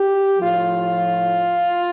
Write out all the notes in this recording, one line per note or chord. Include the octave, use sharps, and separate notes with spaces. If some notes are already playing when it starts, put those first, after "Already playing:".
Already playing: G4
A2 F3 F4